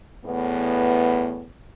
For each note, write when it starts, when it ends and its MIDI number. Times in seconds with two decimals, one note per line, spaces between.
0.24 1.46 40
0.24 1.46 45
0.24 1.46 59